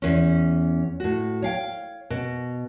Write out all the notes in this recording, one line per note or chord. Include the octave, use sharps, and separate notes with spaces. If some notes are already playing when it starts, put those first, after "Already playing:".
E2 C#4
A2 F#4
C#5 F5 G5
B2